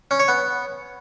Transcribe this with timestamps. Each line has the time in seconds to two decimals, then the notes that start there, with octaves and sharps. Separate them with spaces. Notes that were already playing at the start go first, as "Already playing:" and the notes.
0.11 C#4
0.20 C#5
0.28 B3